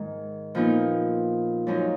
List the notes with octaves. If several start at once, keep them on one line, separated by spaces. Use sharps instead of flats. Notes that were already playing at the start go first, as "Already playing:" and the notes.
Already playing: G#2 D#3 G#3
A#2 F3 B3 D#4
F#2 F3 G#3 D#4